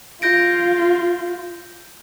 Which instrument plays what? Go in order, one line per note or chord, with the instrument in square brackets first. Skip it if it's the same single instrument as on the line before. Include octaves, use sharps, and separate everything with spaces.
[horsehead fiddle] F4 [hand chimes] G6 A#6 D7